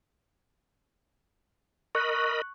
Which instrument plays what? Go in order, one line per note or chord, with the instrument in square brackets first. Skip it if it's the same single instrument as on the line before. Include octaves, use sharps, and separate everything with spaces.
[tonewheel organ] A#4 D#5 B5 [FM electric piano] C#6 F#6